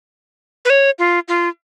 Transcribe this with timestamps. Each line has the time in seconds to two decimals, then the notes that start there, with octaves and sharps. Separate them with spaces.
0.65 B4
0.70 C#5
0.99 F4
1.28 F4